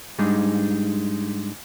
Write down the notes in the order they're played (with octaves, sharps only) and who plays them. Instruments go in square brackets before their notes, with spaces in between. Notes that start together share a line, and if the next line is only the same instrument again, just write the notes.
[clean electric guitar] G#2 G3 G#3 D4 D#4